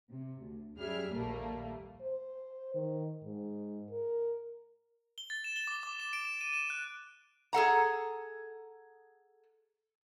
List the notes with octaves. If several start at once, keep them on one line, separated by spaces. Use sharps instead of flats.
C3
D2
F#2 G3 G#4 E5 F6
A#1 D#2 A#2 G3 A3 A#3
C5
D#3
G#2
A#4
G7
A6
E7
G7
D6
D6
E7
D7
E7
D#7
E7
F#6
G#4 A4 F#5 A#5